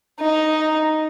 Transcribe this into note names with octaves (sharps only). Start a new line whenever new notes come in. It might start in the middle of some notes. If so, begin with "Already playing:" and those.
D#4